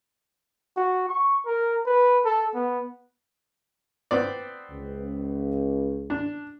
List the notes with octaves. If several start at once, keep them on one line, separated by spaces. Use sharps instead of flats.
F#4
C#6
A#4
B4
A4
B3
B3 C4 D5
C#2
D4